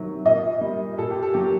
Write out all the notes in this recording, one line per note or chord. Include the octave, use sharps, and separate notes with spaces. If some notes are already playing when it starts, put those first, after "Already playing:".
Already playing: C3 D#3 F#3
A#2 D#5
G3
A#2 A4
G4
A4
F#3 G4